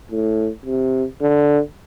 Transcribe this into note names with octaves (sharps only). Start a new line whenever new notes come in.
A2
C3
D3